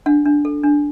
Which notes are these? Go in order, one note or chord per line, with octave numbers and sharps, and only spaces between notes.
D4 F#5
D4
A4
D4